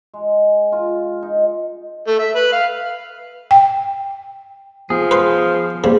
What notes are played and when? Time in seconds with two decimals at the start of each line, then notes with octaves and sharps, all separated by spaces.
0.14 G#3
0.72 F4
1.22 D#4
2.07 A3
2.19 E5
2.36 B4
2.52 F5
3.51 G5
4.90 F3 B3 G#4
5.11 B4 C5
5.84 C#3 G3 A#3 B4 C5